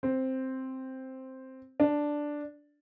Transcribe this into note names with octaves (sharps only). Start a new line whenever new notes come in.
C4
D4